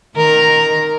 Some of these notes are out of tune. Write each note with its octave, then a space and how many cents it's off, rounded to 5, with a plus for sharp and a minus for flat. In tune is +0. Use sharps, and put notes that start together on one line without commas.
D#3 -20 A#4 +0